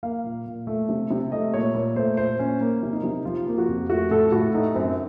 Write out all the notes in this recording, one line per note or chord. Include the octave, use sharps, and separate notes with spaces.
A#3 F5
A#2
A#2
A3
C3
C3
A3 D#5
A#2 C#5
A#2
A3 C5
A#2 C5
A#2 C#4
A#3
C3
D#4
C3
F3 F4
A#3
F#4
F2
A3 F#4
A2 A4
A2 F#4
A3 D#4
F#2 C4